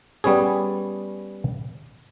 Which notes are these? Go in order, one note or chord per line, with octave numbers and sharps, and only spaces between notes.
G3 B3 C#4 G#4